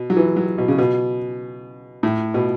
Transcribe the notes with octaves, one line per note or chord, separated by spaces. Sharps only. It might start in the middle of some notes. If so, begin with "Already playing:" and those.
Already playing: B2
F#3
E3
F#3
B2
C#3
B2
A2
B2